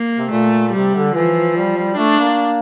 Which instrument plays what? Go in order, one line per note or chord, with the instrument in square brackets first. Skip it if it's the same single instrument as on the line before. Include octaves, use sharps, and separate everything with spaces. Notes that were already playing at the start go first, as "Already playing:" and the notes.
Already playing: [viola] A#3
[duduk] C3
[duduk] A#2 [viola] A3
[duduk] C3 [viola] G3
[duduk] D3
[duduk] E3 [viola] F3
[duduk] G3
G3
[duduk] A3 [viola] D4
[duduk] A#3